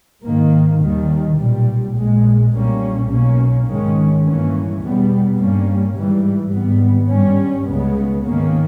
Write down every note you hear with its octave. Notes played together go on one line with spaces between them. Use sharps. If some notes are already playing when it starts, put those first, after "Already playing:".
G#2 D#3 A#3
D#2 D#3 G3
B1 A#2 G3
A#1 A#2 G#3
B1 A#2 G3 A#3 C#4
B1 B2 A#3 C#4
G#2 D#3 G#3 C#4
G2 E3 A#3 C#4
E2 B2 G3 B3
G2 G3 A#3 C#4
G#2 E3 G3
G#1 G#2 G3 B3
G2 G3 C#4
C#2 C#3 G#3 B3
G#2 D#3 A#3 C#4